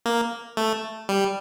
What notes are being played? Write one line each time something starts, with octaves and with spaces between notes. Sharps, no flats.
A#3
A3
G3